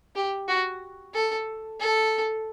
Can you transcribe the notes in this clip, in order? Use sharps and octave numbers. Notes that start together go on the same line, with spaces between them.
G4
F#4
A4
A4